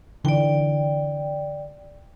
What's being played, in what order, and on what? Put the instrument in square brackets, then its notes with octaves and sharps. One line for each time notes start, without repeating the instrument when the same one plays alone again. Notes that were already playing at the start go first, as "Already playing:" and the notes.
[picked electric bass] D3 E3 [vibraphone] D5 G5